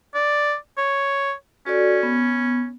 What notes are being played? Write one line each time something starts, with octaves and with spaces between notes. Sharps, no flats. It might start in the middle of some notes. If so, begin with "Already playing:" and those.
D5
C#5
C#4 F#4 A4 D5
B3